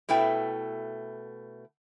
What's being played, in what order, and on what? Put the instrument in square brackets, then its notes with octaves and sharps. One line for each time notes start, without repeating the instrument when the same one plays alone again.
[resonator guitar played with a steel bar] B2 A3 E4 B4 G5